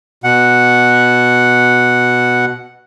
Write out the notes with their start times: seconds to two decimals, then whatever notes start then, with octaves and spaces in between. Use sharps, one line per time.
0.24 B2 F#5